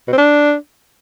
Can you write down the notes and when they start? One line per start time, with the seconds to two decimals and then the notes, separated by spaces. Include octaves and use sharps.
0.07 B2
0.13 C4
0.18 D4